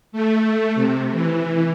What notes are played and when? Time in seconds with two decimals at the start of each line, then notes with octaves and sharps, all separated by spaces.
0.12 A3
0.75 C3
1.12 E3